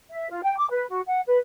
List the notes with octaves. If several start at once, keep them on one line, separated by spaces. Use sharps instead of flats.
E5
F4
G5
D6
B4
F#4
F#5
B4